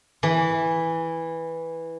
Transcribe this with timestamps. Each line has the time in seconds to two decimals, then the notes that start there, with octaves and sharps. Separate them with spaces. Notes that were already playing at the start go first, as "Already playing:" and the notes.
0.23 E3